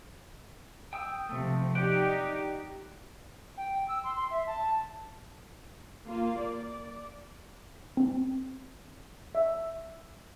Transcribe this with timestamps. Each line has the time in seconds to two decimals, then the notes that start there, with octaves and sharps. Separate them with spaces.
0.93 G5 D#6 E6
1.29 C3 F3 A3
1.75 D#4 G4 D5 F#5 G5
3.57 G5
3.88 E6
4.04 C6
4.16 C6
4.31 E5
4.47 A5
6.06 A#3 F4
6.40 D5
7.97 C4
9.35 E5